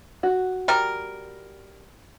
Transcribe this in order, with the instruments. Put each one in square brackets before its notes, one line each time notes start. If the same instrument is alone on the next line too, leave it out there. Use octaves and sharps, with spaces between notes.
[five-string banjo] F#4
[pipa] G3 A#4